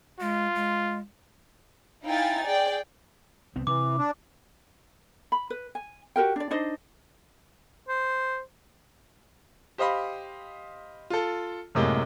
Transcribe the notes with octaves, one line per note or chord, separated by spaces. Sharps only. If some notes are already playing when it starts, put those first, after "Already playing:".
G#3 F4
G#3
D#4 E4 F5 G5 G#5 A6
G#4 D5 G5
C2 B3 C4
C3 E3 D6
D4
B5
B4
G#5
F#4 G4 A#4 G5
D4 D5
D4 D#4 C5 D#5
C5
G4 C5 D#5 F5 B5 C6
F4 A4
F#2 A2 C3 G#3 A#3